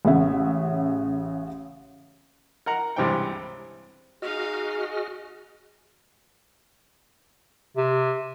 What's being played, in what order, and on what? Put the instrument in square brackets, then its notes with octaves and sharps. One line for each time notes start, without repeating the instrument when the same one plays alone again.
[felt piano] A1 C#3 C#4 E5 F#5
[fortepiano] A#4 F#5 A#5
C#2 G2 C3 E3 C4 G5
[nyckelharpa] D#4 F5 [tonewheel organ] F#4 D#5 F6 [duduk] G#4
[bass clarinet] C3